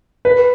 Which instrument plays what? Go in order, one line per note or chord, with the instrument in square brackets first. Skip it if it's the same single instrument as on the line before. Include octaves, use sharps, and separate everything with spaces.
[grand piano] B4